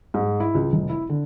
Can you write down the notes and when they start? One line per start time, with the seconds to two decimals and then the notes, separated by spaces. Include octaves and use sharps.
0.14 G#2
0.40 E4
0.55 C#2
0.73 F1
0.89 E4
1.09 D3